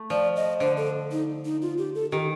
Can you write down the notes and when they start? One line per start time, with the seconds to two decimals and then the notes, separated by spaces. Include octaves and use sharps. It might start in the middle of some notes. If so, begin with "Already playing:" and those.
Already playing: A3
0.10 F3 D5
0.36 D#5
0.60 D3 C5
0.77 A4
1.12 D#4
1.45 D#4
1.62 F4
1.78 G4
1.95 A4
2.12 D#3 G4